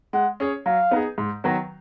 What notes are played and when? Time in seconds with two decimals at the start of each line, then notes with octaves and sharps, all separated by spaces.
0.13 G#3 F#5
0.40 C#4 G#4 C#5
0.66 F#3 F5
0.91 B3 D#4 G#4
1.18 G#2
1.44 D#3 F#3 B3 F#4